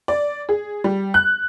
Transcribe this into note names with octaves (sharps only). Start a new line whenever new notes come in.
D5
G#4
G3
F#6